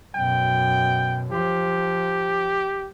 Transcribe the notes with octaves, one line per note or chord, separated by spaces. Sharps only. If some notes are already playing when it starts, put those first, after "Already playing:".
F#2 B2 G5
F3 G4